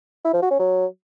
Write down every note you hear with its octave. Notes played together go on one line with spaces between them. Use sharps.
E4
F3
F#4
C#4
F#3